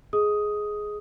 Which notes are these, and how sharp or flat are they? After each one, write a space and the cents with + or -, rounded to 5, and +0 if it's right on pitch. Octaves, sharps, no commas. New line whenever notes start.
G#4 +10 D#5 +25 D#6 +5